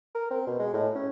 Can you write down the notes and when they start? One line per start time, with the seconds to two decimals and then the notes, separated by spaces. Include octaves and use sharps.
0.15 A#4
0.31 C4
0.47 B2
0.59 G#3
0.73 A2
0.95 C#4